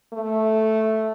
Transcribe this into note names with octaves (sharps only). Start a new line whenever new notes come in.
A3